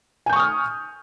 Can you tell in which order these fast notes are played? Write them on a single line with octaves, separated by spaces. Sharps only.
G#5 G6 C#6 D#6 F6